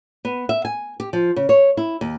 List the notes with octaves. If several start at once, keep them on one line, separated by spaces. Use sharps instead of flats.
B3
E5
G#5
G4
F3
C#3
C#5
E4
D#2